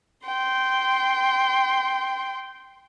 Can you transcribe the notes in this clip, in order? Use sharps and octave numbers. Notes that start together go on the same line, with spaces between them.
G5 C6